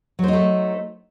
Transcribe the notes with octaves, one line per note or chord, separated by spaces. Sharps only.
F#3 A3 D#4 C5